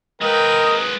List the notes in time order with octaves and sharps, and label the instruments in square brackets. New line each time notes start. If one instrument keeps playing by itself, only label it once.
[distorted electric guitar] G#3 B4 [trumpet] A#4 [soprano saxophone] D#5 [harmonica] G5